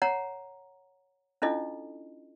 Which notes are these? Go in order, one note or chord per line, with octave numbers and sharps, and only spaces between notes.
C#5 F#5 A#5
C#4 D4 E4 F4 A4 D#5